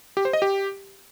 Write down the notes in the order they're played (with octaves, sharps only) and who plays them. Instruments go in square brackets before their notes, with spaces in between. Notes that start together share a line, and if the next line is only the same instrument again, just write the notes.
[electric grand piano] G4
C5
D#5
G4